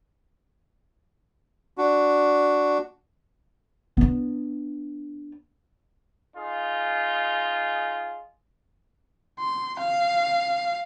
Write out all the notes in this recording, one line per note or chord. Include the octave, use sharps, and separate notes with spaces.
D4 F#4
B3 D4
D#4 F4 G#4
C6
F5